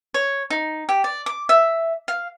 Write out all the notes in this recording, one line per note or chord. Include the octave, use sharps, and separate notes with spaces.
C#5
D#4
G4
D5
D6
E5
F5